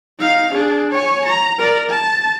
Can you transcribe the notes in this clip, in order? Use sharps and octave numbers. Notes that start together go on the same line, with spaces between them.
D#4 F5
D4 G#4
C#5 G#5
A#5
A#4 D5
A5